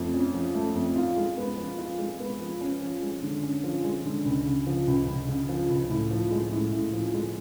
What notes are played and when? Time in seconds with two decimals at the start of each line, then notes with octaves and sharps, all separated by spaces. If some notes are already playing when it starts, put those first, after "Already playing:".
Already playing: F2 A3
0.13 C#4
0.34 F3
0.55 A3
0.75 F2
0.96 F4
1.17 G#3
1.37 B3
1.57 F3
1.78 F4
1.99 G#3
2.20 B3
2.41 F3
2.60 C#4
2.82 F3
3.02 G#3
3.23 D3
3.43 C#4
3.64 F3
3.84 G#3
4.05 D3
4.25 C#2
4.46 C#3
4.66 F3
4.87 C#2
5.07 C#2
5.28 C#3
5.49 F3
5.69 C#2
5.90 A2
6.11 F3
6.31 G#3
6.51 A2
6.72 A2
6.93 F3
7.14 G#3